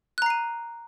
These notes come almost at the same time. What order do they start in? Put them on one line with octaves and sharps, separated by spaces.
F#6 A#5 C7 D#7